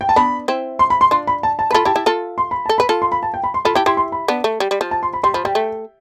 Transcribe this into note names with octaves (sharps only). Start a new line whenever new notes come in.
G5
A5
B3 D4 B5
C4 E4
C6
B5
C6
D4 F4 C6
B5
A5
A5
F4 A4 B4 B5
E4 G4 A5
E4 G4
F4 A4
C6
B5
A4 A5
B4 B5
F4 A4
C6
B5
A5
G5
B5
C6
F4 A4 B5
E4 G4 A5
E4 G4 C6
C6
B5
B3 D4
A3
G3
G3
F3
A5
C6
B5
G3 C6
F3 B5
G3 G5
A3